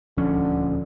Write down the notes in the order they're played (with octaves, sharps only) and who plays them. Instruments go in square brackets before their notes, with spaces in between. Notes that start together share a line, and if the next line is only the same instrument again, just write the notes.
[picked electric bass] D#1 D2 C#4 [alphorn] D3 [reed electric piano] F3